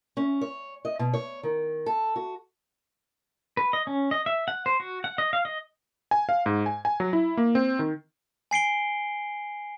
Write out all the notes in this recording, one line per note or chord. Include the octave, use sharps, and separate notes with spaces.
C#4
C#5
D#5
B2
C#5
D#3
A4
F#4
B4
D#5
C#4
D#5
E5
F#5
C5
F#4
F#5
D#5
F5
D#5
G#5
F5
G#2
G#5
G#5
F#3
E4
A#3
C4
D#3
G#5 C7 D7 G7